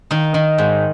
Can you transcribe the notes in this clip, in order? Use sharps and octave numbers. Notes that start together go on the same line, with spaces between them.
D#3 D#4
D#3
G#2